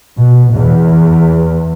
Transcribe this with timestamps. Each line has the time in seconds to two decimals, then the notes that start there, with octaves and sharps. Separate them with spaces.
0.19 B2
0.54 E2